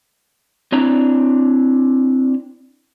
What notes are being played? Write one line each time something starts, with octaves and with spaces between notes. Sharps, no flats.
C4 D4 E4 C#5 D5 A#5